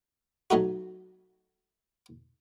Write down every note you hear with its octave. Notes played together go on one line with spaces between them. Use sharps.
F#3 A3 D#4 F#4